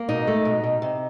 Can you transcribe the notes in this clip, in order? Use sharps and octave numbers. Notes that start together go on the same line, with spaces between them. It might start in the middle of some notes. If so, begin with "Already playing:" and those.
Already playing: A#3
B2 D#4
A3
B2
B2
C3